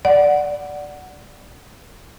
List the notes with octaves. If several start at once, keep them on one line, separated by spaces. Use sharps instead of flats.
D5 F#5